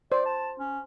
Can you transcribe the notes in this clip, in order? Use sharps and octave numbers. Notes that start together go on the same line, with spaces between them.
C5 D5
A5
C#4